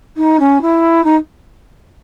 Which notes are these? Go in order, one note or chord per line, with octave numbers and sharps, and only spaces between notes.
D#4
C#4
E4
D#4